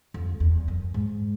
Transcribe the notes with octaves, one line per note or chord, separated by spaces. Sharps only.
F2
E2
F#2
G#2